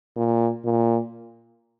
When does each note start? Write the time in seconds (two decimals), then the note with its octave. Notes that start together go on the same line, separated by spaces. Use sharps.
0.16 A#2
0.65 A#2